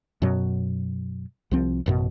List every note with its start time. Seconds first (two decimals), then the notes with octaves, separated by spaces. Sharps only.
0.22 F#2 B2 F#3
1.51 C2 F3 C4
1.86 A1 F#2 B2